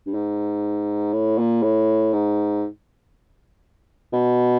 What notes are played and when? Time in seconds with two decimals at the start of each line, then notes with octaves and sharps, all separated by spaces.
0.06 G2
0.14 G#2
1.13 A2
1.39 A#2
1.63 A2
2.13 G#2
4.13 B2